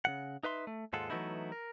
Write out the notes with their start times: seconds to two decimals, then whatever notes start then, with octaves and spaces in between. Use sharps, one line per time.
0.05 C#3 E3 F#5
0.43 D#4 B4 E5 C6
0.67 A3
0.93 D#2 G#2 G#3 F4 A4 F#5
1.10 E3 F#3 A3 B3 D#4 E4
1.52 A#4